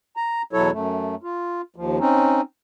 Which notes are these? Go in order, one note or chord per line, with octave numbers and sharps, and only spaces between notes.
A#5
E2 B2 F#3 E4 A4 C#5
F#2 A3
F4
D#2 F3
C4 C#4 D#4